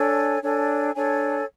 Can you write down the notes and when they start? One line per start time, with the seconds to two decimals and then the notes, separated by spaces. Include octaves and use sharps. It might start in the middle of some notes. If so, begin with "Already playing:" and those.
Already playing: D4 A4 C#5 G#5
0.43 D4 A4 C#5 G#5
0.94 D4 A4 C#5 G#5